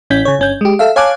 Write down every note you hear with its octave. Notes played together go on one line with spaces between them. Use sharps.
A1 C#4 G6 B6
C#3 C#5
G1 C#4 G6
G#3 G4
A4 E5 F5
C#5 F5 G#5 A5 D6 F#6